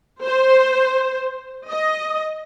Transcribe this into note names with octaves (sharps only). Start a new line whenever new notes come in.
C5
D#5